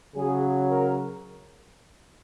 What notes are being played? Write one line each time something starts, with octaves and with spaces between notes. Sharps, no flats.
C#3 F#3 G#4
A#4